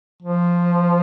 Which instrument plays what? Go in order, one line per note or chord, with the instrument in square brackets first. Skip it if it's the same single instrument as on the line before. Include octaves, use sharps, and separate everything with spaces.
[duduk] F3